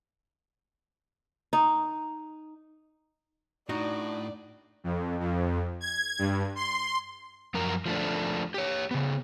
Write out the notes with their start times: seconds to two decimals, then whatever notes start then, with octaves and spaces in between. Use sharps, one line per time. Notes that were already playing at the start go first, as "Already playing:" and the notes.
1.53 D#4
3.69 A2 D4 D#4 F#4 D5
4.84 F2
5.20 F2
5.81 G#6
6.19 G2
6.56 C6
7.54 F#2 F3 A#4
7.86 F3 A3 D4
8.54 G4 C#5
8.91 C#3 B3